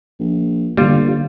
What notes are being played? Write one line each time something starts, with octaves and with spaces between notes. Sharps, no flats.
A#1
G1 D3 G3 A#3 F4